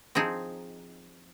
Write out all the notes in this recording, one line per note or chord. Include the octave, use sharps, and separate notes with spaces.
F3 C4 D#4 G#4